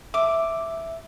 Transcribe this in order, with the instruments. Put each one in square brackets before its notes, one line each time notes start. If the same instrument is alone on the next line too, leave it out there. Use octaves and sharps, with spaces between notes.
[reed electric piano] E5 [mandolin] D6